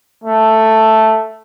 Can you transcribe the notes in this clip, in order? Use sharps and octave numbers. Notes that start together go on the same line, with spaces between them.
A3